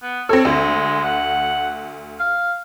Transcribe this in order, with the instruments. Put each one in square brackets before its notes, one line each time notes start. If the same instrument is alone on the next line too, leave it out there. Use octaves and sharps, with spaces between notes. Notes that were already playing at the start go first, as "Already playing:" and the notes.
[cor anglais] B3
[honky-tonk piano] C4 A4 [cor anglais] C#5
[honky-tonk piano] D2 [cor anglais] G#3
[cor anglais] F#5
F5